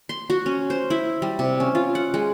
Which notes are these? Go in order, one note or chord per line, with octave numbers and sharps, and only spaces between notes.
C6
F#4
C#4
C5
E4
G3
C3
C#4
F4
F#5
G#3